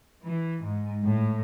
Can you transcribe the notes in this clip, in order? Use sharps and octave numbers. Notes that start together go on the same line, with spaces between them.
E3
G#2
A2